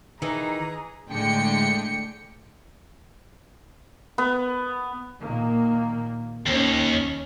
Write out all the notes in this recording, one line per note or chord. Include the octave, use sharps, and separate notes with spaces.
D#3 E3 D#4 G#4 A#5
A2 D3 G#3 G5 C#7
B3
A#2 D#3 A#3
D#2 C#4